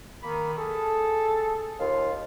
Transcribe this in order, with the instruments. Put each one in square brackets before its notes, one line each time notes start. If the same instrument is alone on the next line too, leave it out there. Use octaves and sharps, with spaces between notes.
[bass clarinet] D#3 [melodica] A#3 B5
[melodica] G#4 [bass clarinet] A4
[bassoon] D#2 [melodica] F4 F5